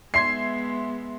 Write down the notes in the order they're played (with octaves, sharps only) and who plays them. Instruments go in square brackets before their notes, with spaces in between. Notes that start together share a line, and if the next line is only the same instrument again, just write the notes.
[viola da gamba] G#3 B3 [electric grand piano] E5 C6 G#6 [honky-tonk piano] C7